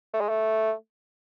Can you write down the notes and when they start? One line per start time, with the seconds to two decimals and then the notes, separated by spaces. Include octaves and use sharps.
0.14 A3
0.21 G#3
0.29 A3